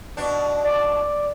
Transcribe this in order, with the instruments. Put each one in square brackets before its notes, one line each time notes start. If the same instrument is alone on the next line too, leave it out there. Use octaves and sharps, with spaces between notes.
[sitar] B2 D4
[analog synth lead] D5